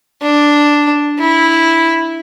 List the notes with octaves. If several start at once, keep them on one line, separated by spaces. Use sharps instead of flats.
D4
E4